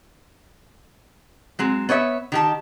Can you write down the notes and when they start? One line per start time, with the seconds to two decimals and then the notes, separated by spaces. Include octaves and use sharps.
1.59 F#3 G#3 C4
1.89 B3 C#5 D5 E5
2.32 D#3 G4 A5